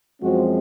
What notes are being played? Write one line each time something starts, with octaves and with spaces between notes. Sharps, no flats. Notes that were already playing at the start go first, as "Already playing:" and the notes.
F#2 F3 G#3 C4 F#4